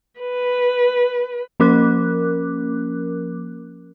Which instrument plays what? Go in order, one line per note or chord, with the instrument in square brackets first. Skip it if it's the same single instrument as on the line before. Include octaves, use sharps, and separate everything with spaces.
[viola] B4
[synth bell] F3 A#3 C#4 A#4 D6 F#6